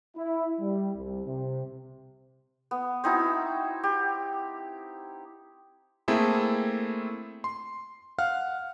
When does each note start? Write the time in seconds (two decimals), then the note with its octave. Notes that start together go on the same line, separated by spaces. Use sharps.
0.16 E4
0.60 G3
0.97 C2
1.27 C3
2.71 B3
3.04 C4 D#4 E4 F#4
3.83 G4
6.08 A3 A#3 C4 E4 G#4 A4
7.44 C6
8.19 F5 F#5 F6